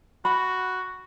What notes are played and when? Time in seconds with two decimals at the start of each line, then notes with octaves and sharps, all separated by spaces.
0.25 F#4 B5